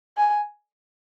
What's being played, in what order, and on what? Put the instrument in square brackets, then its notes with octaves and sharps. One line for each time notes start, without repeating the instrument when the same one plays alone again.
[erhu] G#5